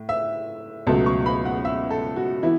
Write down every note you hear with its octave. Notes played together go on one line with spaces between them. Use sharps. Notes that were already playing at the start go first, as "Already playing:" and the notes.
Already playing: A2
E5
C#2 B2 F#3 A3 A5
C#6
B5
F#5
E5
A4
F#4
E3 B3 E4